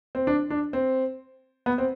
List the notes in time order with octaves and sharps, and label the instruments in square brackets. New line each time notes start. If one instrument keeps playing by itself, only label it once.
[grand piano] C4
D4
D4
C4
B3
C4